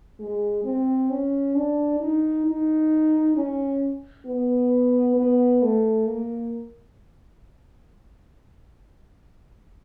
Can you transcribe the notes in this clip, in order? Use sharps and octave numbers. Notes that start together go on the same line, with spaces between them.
G#3
C4
C#4
D4
D#4
D#4
C#4
B3
B3
A3
A#3